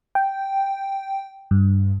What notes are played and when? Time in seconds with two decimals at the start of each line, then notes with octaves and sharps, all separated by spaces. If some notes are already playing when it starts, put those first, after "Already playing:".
0.15 G5
1.51 G2